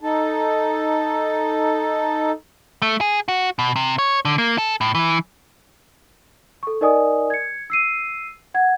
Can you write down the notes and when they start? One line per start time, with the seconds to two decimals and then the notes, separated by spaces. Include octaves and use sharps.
0.01 D#4 A4
2.82 A3
3.01 G#4
3.28 F#4
3.59 B2
3.76 C3
3.98 C#5
4.25 D3
4.38 A#3
4.58 A4
4.81 A2
4.95 E3
6.63 A4 C#6
6.81 D#4 A#4 D5 D#5 G#5 D#6
7.30 G#6 C#7
7.70 E6 C7 D#7
8.54 F#5 G#6